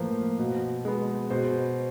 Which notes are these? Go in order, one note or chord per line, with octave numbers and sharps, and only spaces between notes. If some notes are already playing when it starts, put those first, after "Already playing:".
Already playing: A2 F3 A#3 B4 C5
B2
G#3 B3
B2 C5